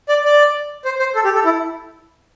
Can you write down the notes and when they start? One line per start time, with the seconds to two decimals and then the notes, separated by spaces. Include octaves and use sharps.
0.09 D5
0.25 D5
0.85 C5
0.99 C5
1.15 A4
1.25 G4
1.35 A4
1.45 E4